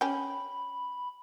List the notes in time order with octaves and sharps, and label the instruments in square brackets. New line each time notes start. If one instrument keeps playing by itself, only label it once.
[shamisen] C#4 G4 [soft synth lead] B5